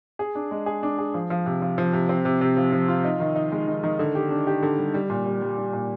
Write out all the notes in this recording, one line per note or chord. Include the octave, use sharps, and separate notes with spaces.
G#4
D4
G#3
G#4
D4
G#4
F3
F3
C3
F3
F3
C3
C4
C3
C3
F3
F3
F4
D#4
D#3
D#4
G#3
D#3
D#3
D3
G4
D4
G4
D3
G3
G3
A#2
G3
G3
G3
A#2